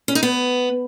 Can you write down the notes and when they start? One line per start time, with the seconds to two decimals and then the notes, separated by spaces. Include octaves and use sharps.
0.08 C#4
0.15 D#4
0.23 B3